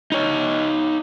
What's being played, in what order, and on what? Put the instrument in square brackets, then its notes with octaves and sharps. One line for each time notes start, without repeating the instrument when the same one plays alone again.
[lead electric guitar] D#4 C#5